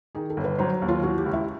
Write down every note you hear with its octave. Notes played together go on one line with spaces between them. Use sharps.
D#3 G#4
A4
G1
B4
F#3 C5
D#2
F4
E3 F#4
G4
C#2
E4